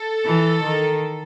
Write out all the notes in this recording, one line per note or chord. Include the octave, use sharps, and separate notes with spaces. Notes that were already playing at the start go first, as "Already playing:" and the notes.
Already playing: A4
E3
D#3